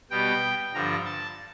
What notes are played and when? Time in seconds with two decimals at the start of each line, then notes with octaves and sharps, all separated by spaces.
0.11 B2 G3 B3 G5
0.74 G2 D3 F3 A#5
1.05 A5